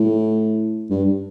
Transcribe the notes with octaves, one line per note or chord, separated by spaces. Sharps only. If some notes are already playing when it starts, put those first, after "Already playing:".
Already playing: A2
G2